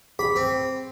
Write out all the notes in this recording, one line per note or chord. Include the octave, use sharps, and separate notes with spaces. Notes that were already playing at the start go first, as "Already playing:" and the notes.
G#4 B5
C4